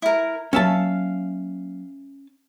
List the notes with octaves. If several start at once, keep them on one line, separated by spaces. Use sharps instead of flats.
E4 A#4
F#3 A#3 C#4 E5 F5 A5